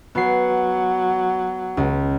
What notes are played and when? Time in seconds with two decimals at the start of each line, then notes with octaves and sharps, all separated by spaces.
0.15 F#3 B3 C7
1.77 C#2